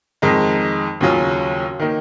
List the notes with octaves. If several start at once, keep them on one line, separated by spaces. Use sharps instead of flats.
F2 D#3 G#3 D#4
D#2 C#3 F#3 C#4 F4
D#3 A#3 D#4